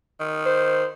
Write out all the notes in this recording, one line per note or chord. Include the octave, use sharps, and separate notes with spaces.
D#3
C5